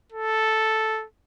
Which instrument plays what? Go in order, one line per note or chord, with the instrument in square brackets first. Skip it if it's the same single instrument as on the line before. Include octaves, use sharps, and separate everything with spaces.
[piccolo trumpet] A4